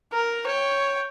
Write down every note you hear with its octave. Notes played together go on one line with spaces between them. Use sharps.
A#4
C#5 G5